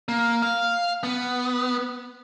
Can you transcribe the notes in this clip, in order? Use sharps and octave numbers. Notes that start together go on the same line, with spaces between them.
A#3
F5
B3